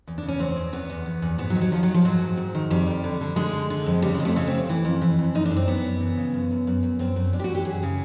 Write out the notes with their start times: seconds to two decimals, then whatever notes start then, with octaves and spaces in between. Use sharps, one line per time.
0.07 E2
0.18 C#3 D4
0.28 C#4
0.39 E2 C4
0.56 E2
0.73 E2 B3
0.90 E2
1.06 E2
1.22 E2
1.38 G#2 B3
1.50 F#3
1.55 D#3
1.61 F#3
1.71 D#3 F3
1.83 F#3
1.88 D#3
1.94 F3
2.05 G#2 F#3
2.21 G#2
2.37 G#2
2.55 D#3
2.70 F2 G3
2.87 F2
3.04 D3
3.21 D3
3.36 D3 G#3
3.53 D3
3.70 D3
3.86 F2
4.02 C#3 G3
4.14 G#3
4.20 F2
4.25 A3
4.36 C#3 A3
4.47 C4
4.53 F2
4.69 E3
4.85 F2
5.02 E3
5.19 F2
5.35 F#2 D#4
5.45 D4
5.51 F#2
5.56 C4
5.67 F#2 B3
5.85 F#2
6.01 E3
6.17 C#3
6.34 F#2
6.51 F#2
6.67 F#2
6.83 F#2
6.99 F#2 C4
7.16 F#2
7.33 F#2 D4
7.40 G4
7.44 F#4
7.49 E3
7.55 G4
7.65 F#2 G#4
7.83 C#3